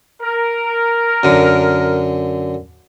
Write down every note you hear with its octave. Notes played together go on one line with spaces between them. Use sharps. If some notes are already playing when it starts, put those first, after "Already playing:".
A#4
F#2 D3